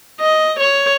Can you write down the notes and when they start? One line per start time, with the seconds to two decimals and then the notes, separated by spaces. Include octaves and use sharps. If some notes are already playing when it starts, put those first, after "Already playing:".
0.20 D#5
0.60 C#5